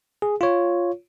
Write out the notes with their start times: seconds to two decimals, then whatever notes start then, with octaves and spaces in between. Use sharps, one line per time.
0.22 G#4
0.41 F4 C#5